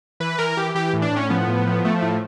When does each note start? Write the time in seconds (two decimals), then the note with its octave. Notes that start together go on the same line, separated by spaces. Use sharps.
0.20 E3 B4
0.38 E3 A#4
0.57 E3 G4
0.75 E3 G4
0.93 A2
1.02 D4
1.11 A2
1.16 C#4
1.30 F3 B3
1.47 A2
1.67 F3
1.85 F3 A3
2.02 A2